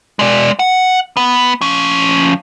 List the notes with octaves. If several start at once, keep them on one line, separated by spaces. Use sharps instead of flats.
G#3 D5
F#5
B3
F3 C#4